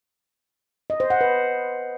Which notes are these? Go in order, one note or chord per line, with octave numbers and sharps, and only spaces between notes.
D#5
C5
F#5
B4